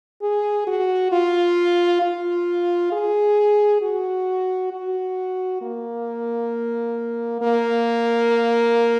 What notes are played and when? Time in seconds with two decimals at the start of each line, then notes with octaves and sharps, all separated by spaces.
0.22 G#4
0.67 F#4
1.12 F4
2.02 F4
2.92 G#4
3.82 F#4
4.72 F#4
5.62 A#3
7.41 A#3